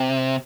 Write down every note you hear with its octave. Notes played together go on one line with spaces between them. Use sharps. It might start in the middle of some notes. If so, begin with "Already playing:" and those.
Already playing: C3